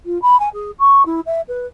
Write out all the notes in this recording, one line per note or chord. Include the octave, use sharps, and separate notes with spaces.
F4
B5
G#5
G#4
C#6
E4
E5
B4